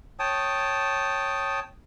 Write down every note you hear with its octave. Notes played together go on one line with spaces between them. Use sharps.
C#5 G5 A5 D#6